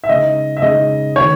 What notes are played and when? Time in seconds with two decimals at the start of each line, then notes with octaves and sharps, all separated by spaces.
0.04 E5
0.09 C#3 G#3 D#4 D#5
0.57 E5
0.62 C#3 G#3 D#4 D#5
1.16 D#3 C#5